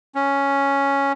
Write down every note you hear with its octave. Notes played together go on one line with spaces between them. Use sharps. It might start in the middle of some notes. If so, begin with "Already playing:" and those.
C#4